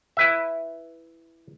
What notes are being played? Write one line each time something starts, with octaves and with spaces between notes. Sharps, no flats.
E4 B4 E5